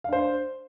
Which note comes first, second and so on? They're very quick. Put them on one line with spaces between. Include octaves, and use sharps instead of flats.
F5 D4 C5